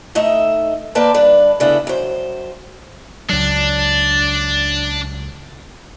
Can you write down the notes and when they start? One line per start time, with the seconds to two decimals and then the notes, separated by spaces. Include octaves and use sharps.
0.15 A3 D#4 D#5 E5
0.95 A#3 B4 D5 G5 A5
1.14 G2 D4 B4
1.60 C#3 A3 B3 D4 E4
1.87 F#2 C5
3.29 C#2 F#3 D4